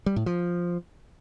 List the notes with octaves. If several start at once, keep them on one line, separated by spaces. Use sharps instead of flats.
G3
A2
F3